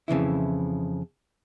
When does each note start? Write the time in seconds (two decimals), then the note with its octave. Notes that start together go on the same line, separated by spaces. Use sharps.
0.08 F2 C#3 E3 E4